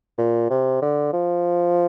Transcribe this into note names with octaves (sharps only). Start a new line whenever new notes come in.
A#2
C3
D3
F3